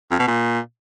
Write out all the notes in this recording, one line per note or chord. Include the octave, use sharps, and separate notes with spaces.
F2
B2
A#2